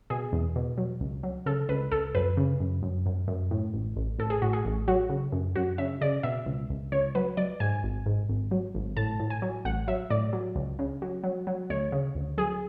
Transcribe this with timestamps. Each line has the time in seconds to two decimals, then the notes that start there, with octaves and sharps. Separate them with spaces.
0.10 B2 G#4
0.33 E2
0.56 B2
0.78 F#3
1.00 C#2
1.23 F#3
1.46 C#3 A4
1.69 C#2 B4
1.92 C#2 A4
2.15 F#2 B4
2.37 C#3
2.60 F#2
2.83 F#2
3.06 F#2
3.28 F#2
3.51 A2
3.74 A1
3.96 A1
4.19 A1 A4
4.30 G#4
4.42 A2 F#4
4.53 G#4
4.65 A1
4.88 F#3 F#4
5.09 C#3
5.32 F#2
5.55 F#2 F#4
5.78 C#3 E5
6.01 C#3 D5
6.23 B2 E5
6.46 C#2
6.70 C#2
6.92 C#2 C#5
7.15 F#3 B4
7.37 F#3 D5
7.60 G#2 G#5
7.83 G#1
8.06 G#2
8.29 G#1
8.51 F#3
8.75 G#1
8.96 A2 A5
9.20 A2
9.30 G#5
9.42 F#3
9.65 A1 F#5
9.88 F#3 E5
10.10 A2 D5
10.33 F#3
10.56 C#2
10.79 C#3
11.02 F#3
11.24 F#3
11.47 F#3
11.70 D2 C#5
11.92 C#3
12.15 D2
12.38 F#3 G#4